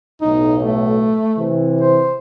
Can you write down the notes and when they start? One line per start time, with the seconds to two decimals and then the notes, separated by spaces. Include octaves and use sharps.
0.22 B1 A2 D#4
0.62 A3
1.37 C3 E3
1.81 C5